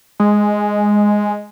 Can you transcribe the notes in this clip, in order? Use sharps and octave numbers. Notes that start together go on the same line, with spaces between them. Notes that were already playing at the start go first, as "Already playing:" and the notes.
G#3